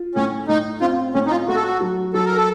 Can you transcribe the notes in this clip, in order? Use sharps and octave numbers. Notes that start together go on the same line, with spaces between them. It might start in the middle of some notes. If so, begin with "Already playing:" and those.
Already playing: F4
A2 C#4
A2 D#4
C4 F4
A2 C#4
D#4
F4
A3 F#4
A4
F#4
F#3
F#3 A4
A#4
A4